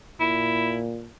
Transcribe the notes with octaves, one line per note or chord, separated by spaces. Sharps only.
A#2 E4